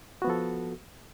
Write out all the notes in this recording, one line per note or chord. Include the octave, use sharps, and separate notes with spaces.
F3 B3 F#4 A4